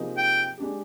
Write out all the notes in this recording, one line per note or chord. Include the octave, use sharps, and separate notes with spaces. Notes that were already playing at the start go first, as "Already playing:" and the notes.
Already playing: C3 F3 A#3 D#4 G#4
G5
G#3 D4 G4